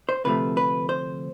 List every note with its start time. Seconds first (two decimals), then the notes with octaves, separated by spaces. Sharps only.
0.09 C5
0.24 D2 C3 F3 A3 B4
0.57 B4
0.89 C5